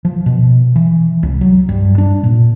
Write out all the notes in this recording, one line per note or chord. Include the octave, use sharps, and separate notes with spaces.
F3
B2
E3
C2
F#3
G2
D4
A#2